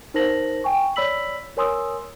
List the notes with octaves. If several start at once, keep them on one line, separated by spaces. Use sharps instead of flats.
D#4 A#4 C5 A5 A#6 F#7
G5 G#5 C#6
C#5 D5 B5 E6 B6 F#7
A#4 C#5 G#5 C6 D#6 E6